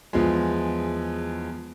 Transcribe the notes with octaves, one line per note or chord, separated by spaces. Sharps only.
E2 F3 G#3